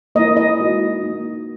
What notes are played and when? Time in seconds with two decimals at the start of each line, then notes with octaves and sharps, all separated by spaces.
0.15 A#3 D#5
0.19 E4
0.37 D#5
0.59 G#3 D#4 F#4
1.01 A#3 D#4 F#4